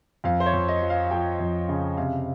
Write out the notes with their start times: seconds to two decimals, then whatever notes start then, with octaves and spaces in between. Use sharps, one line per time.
0.24 F2 F5
0.40 C5
0.46 C#5
0.53 F2
0.68 D#5
0.82 F3
0.90 F5
1.06 F5
1.11 F3 G5
1.39 F2
1.69 C#3
1.97 C3 F5